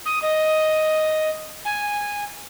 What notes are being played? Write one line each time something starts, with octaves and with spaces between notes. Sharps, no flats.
D#6
D#5
G#5